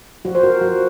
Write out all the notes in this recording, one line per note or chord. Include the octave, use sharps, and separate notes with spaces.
F3 F#4
C5
F#4 A#4
F3 F#4